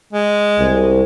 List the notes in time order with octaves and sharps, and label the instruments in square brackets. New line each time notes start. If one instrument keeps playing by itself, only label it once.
[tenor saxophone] G#3
[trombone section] C2